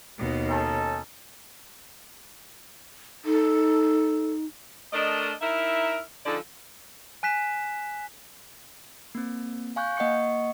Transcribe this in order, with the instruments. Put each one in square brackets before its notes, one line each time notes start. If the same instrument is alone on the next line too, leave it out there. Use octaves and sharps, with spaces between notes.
[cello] D#2 B2
[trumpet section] C#4 D#4 A4
[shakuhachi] D#4 [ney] A4
[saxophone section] A3 D4 A#4 D5 D#5
D#4 E4 A#4 E5
D3 F3 G#3 D#4 A4 D5
[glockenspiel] G#5 F#6 B6 E7
[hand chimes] A#3 C4
F5 G#5 C#6 F#6 G6
A#3 D#5 F#5 C#6 C#7